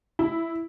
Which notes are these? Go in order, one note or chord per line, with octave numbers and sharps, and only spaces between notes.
E4